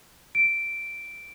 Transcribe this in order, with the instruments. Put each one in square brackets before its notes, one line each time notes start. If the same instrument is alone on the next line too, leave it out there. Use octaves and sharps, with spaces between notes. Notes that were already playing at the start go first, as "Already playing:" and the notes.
[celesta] D7